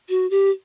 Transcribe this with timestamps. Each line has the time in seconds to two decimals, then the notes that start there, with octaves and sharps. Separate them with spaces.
0.09 F#4
0.30 G4